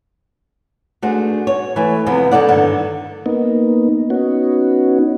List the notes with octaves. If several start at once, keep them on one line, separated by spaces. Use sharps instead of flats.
A3 D4 F#4 G#4 C5
C#5
E3 A3 G#5
E2 C3 F3 B3
C#4 D#4 A4 D5 F#5
G2 D3 D#3
A#3 B3 D#4
B3 C#4 D#4 F#4